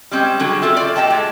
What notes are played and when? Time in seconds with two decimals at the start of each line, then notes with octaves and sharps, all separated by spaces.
0.11 G3 G#3 C4 C#4
0.40 D3 F#3 G#3 F#4 G#4
0.62 C4 F4 A4 E5
0.77 D5
0.96 A#2 G4 D#5 G5 A5
1.10 G#3 A3